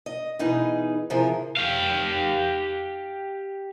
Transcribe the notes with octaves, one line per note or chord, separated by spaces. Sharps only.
D#5
B2 E3 D#4 G#4 B4
C3 E3 F3 G#4 A#4
G4 F5